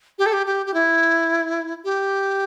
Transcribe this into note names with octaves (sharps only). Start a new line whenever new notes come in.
G4
A4
G4
G4
G4
E4
G4